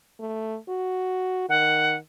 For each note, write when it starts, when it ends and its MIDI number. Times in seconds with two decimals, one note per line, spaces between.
0.20 0.57 57
0.69 1.48 66
1.49 1.98 51
1.49 1.96 78